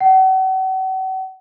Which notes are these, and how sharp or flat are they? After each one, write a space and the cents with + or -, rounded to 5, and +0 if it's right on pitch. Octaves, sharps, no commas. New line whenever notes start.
F#5 +40